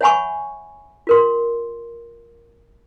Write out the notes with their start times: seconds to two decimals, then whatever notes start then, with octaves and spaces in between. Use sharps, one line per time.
0.01 C#5 E5 F#5 G#5 B5 C#6
1.07 F4 A#4 C6